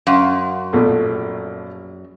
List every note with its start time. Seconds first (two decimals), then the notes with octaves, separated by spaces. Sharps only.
0.07 F#2 F5 F#5 C6
0.73 A#1 B2 A3